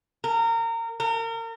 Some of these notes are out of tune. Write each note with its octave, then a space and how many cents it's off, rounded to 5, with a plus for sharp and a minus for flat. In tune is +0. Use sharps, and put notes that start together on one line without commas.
A#4 -25
A#4 -35